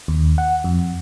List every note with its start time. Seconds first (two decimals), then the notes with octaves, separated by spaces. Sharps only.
0.08 D#2
0.38 F#5
0.64 F2